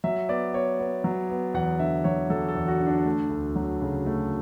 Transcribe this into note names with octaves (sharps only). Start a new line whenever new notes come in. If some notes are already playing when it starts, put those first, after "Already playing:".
F#3 E5
B3 D5
B3 C#5
B3
F#3
B3
E2 F#5
D3 E5
F#3 C#5
F#3 A4
A4
E2
F#4
D3
D4
A3
D2
F#3
C#3
A3